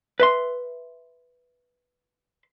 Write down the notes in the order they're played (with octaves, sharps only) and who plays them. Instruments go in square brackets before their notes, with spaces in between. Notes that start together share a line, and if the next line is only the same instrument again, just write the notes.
[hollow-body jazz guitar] B4 E5 C6